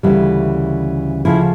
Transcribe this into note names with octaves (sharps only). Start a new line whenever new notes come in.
D2 C#3 E3 G3
D2 C#3 F3 E4